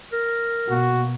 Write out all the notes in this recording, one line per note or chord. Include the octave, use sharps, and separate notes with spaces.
A#4
B2 A#3 F#4